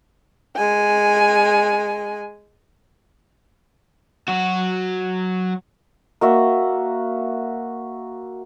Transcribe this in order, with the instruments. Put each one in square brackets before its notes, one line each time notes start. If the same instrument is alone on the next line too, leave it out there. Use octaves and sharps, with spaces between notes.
[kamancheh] G#3 G#5
[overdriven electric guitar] F#3 F#4
[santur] A#3 F#4 E5